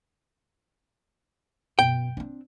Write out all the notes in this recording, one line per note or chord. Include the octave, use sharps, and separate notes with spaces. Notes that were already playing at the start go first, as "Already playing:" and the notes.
F#2 B2 G5
C4 D4